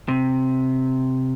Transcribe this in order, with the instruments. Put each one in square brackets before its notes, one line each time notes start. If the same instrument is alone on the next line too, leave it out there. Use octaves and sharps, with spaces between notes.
[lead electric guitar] C3